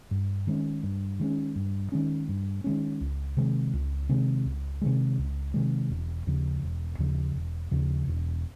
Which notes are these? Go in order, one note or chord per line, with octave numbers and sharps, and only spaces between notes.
G2
D#3 G#3 C#4
G2
D#3 G#3 C#4
G2
D#3 G#3 C#4
G2
D#3 G#3 C#4
C#2
C3 D#3 G#3
C#2
C3 D#3 G#3
C#2
C3 D#3 G#3
C#2
C3 D#3 G#3
E1
D#2 C#3 F3
E1
D#2 C#3 F3
E1
D#2 C#3 F3
E1